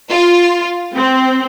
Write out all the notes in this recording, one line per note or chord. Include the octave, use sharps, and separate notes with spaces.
F4
C4